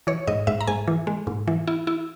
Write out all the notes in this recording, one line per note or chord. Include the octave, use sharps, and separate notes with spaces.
E3 C#5
G#2 D#5
G#2 E5
A#5
G#2 G#5
E3
G#3
G#2
E3
E4
E4